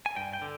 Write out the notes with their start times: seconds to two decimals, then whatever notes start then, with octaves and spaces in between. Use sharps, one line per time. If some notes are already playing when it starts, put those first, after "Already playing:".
0.06 G#5
0.16 G2 G5
0.33 G5
0.42 D3